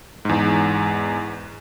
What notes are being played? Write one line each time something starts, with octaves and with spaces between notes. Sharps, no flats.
E2 G#2